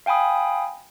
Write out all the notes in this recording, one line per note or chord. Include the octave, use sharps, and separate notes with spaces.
F5 G5 G#5 B5 D#6